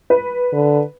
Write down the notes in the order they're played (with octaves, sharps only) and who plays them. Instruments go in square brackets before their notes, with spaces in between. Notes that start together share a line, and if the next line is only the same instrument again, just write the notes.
[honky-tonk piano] B4
[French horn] D3